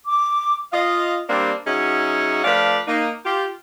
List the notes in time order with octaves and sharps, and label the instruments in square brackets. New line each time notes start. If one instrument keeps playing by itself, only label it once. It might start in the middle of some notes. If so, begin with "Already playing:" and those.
[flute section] D6
[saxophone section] F4 D#5 F5
G3 A#3 C4 D4
F#3 C#4 D#4 F#4 G#4 E5
F3 A3 D4 B4 D5 F5
A#3 D#4
F4 G4